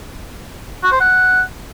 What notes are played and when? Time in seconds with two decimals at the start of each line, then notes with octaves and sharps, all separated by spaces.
0.84 F#4
0.92 C5
1.01 F#5